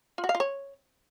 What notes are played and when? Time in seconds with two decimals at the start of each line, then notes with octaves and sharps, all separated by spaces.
0.18 F4
0.24 F#4
0.29 F5
0.35 F4
0.40 C#5